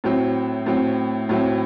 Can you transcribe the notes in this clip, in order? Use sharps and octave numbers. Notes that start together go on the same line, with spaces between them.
A2 F#3 C4
A2 F#3 C4
A2 F#3 C4